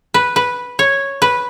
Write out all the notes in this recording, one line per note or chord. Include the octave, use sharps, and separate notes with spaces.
B4
B4
C#5
B4